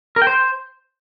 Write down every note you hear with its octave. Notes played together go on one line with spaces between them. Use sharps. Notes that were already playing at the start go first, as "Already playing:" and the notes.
A#4
G5
C5